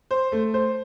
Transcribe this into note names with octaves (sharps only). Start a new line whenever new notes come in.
C5
A3
C5